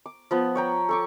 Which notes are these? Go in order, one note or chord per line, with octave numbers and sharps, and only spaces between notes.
D6
F3 B3
C#5 G5 A#5
A4 C#6 D6